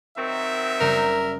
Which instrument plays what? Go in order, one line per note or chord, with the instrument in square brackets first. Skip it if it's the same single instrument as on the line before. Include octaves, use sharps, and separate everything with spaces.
[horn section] D#3 F#3 C4 [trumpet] E5 [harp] C#6
[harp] F#1 G3 A#5 [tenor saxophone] A#4